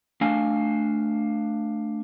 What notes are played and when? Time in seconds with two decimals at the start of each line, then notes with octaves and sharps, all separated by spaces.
0.21 A3 D4 F5 G#5